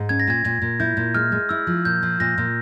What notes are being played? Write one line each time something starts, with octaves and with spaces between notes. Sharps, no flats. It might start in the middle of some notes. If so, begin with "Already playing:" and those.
Already playing: G#2
C#4 G#6
A#6
A#2 G#6
A#2 G#6
A#2
E4 G6
A#2
G#3 F6
G#3
E4 E6
F3
A#2 G6
F3
A#2 A#6
A#2